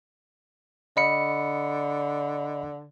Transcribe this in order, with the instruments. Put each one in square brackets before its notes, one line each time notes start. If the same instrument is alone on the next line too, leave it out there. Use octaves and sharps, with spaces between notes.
[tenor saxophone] D3 [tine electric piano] D#5 B5 C#7